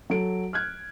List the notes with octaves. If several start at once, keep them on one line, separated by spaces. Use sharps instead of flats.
F#3 A4 D7
F6 F#6 G#6